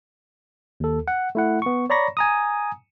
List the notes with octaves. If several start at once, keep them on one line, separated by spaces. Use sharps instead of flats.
D#2 A4
F#5
A3 E4 F#5
B3 C#6
C#5 D5 A#5 B5 C#6 A#6
G#5 A#5 D#6